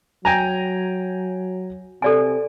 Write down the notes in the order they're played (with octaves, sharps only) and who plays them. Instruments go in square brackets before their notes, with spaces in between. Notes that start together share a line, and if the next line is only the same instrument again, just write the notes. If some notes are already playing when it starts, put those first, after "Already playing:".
[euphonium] F#3 [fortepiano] G5 G#5 A#5
[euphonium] C3 [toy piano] A4 D5 G#5